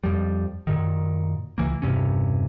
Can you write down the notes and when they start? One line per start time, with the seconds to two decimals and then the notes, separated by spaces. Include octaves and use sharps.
0.04 F2 F3 G3
0.67 F#2 A#2 D#3
1.58 C#2 E3 A#3
1.82 E1 G2 C3 C#4